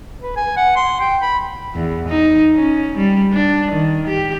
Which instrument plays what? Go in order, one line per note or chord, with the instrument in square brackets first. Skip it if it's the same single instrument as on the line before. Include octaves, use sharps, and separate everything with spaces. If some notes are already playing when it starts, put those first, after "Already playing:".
[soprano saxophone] B4
G#5
F#5
C6
G5
B5
[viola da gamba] E2
D#4
C#4
G3
D4
D#3
G4